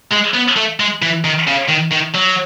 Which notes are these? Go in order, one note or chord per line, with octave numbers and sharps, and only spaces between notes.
G#3
B3
A3
G#3
E3
D#3
C#3
D#3
D#3
F#3